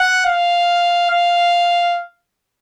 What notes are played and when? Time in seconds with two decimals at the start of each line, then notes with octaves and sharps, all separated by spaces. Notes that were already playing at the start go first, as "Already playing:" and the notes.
Already playing: F#5
0.26 F5
1.10 F5